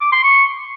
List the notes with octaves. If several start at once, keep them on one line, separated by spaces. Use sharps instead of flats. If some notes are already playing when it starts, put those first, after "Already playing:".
D6
C6
C#6